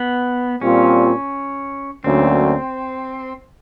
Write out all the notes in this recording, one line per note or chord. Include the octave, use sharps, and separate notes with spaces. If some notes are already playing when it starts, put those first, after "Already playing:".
Already playing: B3
A#2 G3 C4 C#4 F4
D2 D3 F#3 A#3 C4 C#4